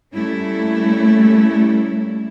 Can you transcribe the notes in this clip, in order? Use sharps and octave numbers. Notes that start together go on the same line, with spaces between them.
G3 A3 A#3 C#4 E4